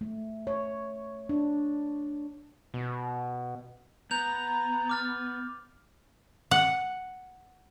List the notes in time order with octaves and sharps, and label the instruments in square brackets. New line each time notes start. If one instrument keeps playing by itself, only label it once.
[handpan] A3
C#5
D4
[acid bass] B2
[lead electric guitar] B3 [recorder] A#5 [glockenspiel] G6 F7
[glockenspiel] D6 F6 A6
[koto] F#5